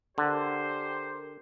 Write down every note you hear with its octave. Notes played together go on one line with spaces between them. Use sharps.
D3 G4 A#4 C5